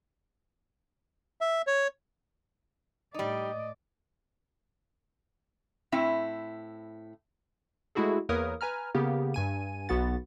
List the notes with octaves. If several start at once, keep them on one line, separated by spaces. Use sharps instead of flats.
E5
C#5
A2 G3 D#4 D5 D#5
A2 C4 E4 E5
G#3 A3 E4 F#4 G#4 A4
E2 A#3 A#4 B4 C#5 D#6
B4 G#5 A#5 F6
C#3 A#3 B3 G4 A#4
G2 G#5 D#7
B1 B3 F#4 F#5 A6